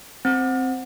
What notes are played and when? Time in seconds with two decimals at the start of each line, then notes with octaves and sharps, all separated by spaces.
0.25 C4